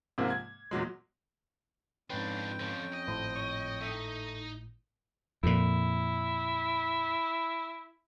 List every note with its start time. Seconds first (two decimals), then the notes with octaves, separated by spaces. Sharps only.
0.18 G#2 C3 F3 G#3 A#3 C4
0.30 G#6
0.71 E2 A#2 F#3 G#3
2.10 F2 G#2 C#4 D4 F4 B4 G5
2.60 D3 F3 C#4
2.93 D#5
3.07 G#1 A2 C5
3.36 C#5
3.81 A3 D#4 D#5
5.43 F2 A#2 E4